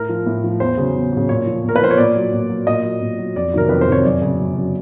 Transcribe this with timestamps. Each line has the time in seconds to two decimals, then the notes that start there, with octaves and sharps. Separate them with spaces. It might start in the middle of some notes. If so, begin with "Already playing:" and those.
Already playing: A2 A#4
0.09 F3
0.26 A2
0.44 F3
0.60 E2 C5
0.77 C#3 F#3
0.95 E2
1.12 C#3 F#3
1.29 A#2 C#5
1.47 F3
1.64 A#2
1.69 A#4
1.76 B4
1.81 F3 C5
1.91 C#5
1.98 A#2 D5
2.16 F#3
2.32 A#2
2.49 F#3
2.67 A#2 D#5
2.84 F#3
3.01 A#2
3.19 F#3
3.36 F2 D5
3.53 C3 D#3 F#3 A#4
3.69 F2 B4
3.81 C5
3.87 C3 D#3 F#3 C#5
4.04 F#2 D5
4.21 C#3 F#3
4.39 F#2
4.56 C#3 F#3